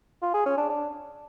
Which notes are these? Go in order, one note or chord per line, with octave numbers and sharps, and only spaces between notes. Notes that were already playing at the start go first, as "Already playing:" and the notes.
F4
G#4
C#4
D4
D4